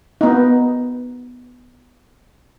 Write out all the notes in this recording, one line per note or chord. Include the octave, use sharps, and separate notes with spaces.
B3 D#4